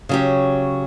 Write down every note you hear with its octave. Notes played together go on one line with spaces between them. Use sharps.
C#3 F#3 G4